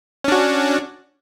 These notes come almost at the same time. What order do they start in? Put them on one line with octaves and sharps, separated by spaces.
C#4 D4 F#4